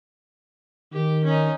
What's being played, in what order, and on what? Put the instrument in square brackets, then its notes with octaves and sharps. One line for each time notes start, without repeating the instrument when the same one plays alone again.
[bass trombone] D#3 [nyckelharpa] G4
[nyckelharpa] C#4 D#4